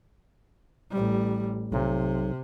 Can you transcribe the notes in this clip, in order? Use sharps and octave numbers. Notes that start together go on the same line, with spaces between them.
A1 G3
B1 C3